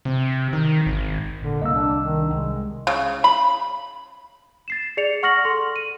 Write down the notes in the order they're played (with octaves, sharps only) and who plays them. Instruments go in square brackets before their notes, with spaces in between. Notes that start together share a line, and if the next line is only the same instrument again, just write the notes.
[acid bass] C3
D#3
G#1
[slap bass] A#2 [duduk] D3
[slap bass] C2 [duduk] A#3 [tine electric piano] D#5 E6
[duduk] D4
D#3
[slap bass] C2 [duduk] G#3
[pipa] C#3
B5
[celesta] A6 C7 E7
G#4 D5 C#7 F7
F#5 C#6 F6 A#6 C#7 F#7
A4 C6
D#7